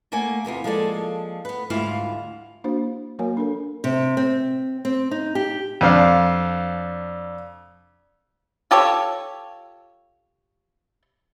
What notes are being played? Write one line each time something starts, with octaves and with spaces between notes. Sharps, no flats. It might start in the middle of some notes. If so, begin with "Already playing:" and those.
A3 A#3 A#4 F#5 G#5
E2 C3 B3 F4
F3 G#3 A#3 A4 D5
B3 B4
D2 G#2 G3 E4 F4 F5
A#3 D4 E4 F#4 C5
F#3 A#3 F#4 A#4 C#5 G#5
D4 A4 A#4
C3
C4
C4
D#4
G4
F2 D4 F5
F4 G4 A4 C#5